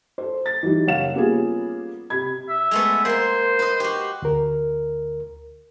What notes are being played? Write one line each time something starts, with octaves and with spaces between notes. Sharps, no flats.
A4 C5
A6
E3 F#3 G3 D#4
F#1 C#5 F5 F#5 E7
G3 A#3 B3 C#4 F4 G#4
C3 B5 G#6
E5
G#3 A3 B3
A#3 C5 C6
B4 D#5
F#4 G4
D2 A#4